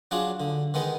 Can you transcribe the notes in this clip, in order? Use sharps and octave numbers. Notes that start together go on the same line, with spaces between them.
F#3 D4 F4 G#4
D3
D#3 G#3 B3 D#4